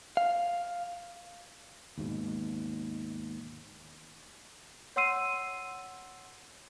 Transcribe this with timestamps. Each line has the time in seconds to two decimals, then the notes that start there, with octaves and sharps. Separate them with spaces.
0.17 F5
1.98 D#2 G#2 B2
4.96 C#5 F#5 C6 E6 C7 D#7